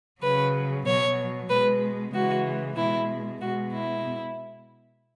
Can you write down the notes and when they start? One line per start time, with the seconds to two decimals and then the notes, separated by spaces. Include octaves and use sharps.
0.22 C#3 F#3 B4
0.85 B2 F#3 C#5
1.49 B2 G#3 B4
2.13 C#3 E3 G#3 F#4
2.76 B2 G#3 E4
3.41 B2 G#3 F#4
3.72 E4